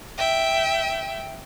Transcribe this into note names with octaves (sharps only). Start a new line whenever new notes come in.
E5 G5